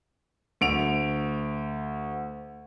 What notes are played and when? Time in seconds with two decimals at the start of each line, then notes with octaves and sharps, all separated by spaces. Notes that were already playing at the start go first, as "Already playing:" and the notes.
0.61 D2 D7 F7